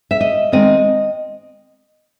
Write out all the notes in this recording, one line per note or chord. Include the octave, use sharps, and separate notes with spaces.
E5
D#5
D#3 G#3 C4 D#5